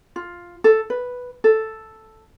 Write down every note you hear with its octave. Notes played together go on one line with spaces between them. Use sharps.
F4
A4
B4
A4